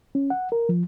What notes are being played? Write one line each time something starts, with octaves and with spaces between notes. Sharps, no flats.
C#4
F#5
A#4
F3